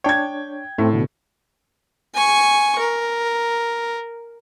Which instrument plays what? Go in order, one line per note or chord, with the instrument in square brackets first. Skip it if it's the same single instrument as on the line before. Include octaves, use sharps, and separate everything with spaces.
[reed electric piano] D4 C#5 [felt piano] G5 G#6
[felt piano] A2 [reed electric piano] A3 C4
[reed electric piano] B2 D3
[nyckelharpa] G#5 C#6
A#4